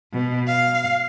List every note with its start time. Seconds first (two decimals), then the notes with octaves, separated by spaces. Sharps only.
0.13 B2
0.48 F5